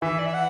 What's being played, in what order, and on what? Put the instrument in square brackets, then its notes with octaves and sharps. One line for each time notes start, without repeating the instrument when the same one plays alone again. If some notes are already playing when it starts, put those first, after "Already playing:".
[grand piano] E3 [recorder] E5
[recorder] D5
E5
F#5